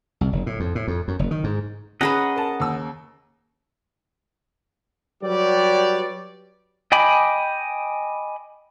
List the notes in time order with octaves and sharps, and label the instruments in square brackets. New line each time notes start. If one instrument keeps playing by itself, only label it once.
[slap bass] C2
F#1
A2
F2
A2
F2
F#2
F#1
D#3
G#2
[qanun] C#4 G#4 B4 [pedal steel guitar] D#5 F#5 A#5
[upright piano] A#4 A5
D#2 E6
[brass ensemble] F#3 G3 G4 B4 C#5 D5
[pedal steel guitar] D#5 G5 G#5 B5 D6